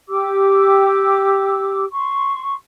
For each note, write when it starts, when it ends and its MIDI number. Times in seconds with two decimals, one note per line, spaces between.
0.08 1.85 67
0.08 1.85 86
0.08 1.85 88
1.92 2.55 84
1.92 2.55 85